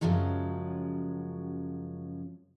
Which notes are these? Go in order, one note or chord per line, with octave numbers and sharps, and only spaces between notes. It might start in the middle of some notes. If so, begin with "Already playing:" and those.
F#2 A2 C#3 F3 F#3 G#3